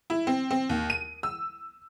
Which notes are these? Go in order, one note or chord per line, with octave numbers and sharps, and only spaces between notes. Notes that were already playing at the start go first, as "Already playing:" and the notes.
E4
C4
C4
D#2
D#7
E6